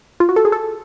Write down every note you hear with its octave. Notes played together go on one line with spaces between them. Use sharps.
F4
F#4
A4
G#4
A4